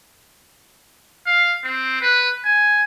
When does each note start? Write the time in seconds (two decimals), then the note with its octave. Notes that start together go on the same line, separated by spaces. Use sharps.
1.27 F5
1.64 C4
2.01 B4
2.45 G#5